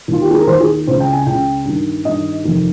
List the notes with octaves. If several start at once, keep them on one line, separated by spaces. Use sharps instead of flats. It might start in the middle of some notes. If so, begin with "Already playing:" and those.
D#2 D#3 F4
G4
G#4
A#4
D#2 D#3 C5
G#4
C#2 C#3 C5
G5
G#5
C#2 C#3 G5
G2 D#3
G2 D#3 D#5
F2 C3 D#3